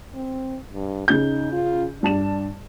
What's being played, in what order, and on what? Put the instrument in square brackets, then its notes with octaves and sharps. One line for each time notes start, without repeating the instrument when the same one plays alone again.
[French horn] C4
G2
[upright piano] C#3 G6 [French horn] D#4
[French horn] F4
[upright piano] G2 A5 E7 [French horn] D4